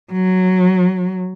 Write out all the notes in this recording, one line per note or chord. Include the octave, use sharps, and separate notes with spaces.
F#3